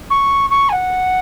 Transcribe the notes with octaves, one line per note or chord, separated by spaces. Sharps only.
C#6
C#6
G#5
F#5